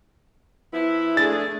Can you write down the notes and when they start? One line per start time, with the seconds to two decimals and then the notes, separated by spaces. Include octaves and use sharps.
0.73 F3 B3 E4
1.17 A3 D4 G#4 A6